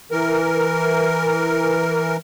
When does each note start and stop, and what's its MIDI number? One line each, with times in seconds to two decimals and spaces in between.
0.11 2.17 52
0.11 2.17 70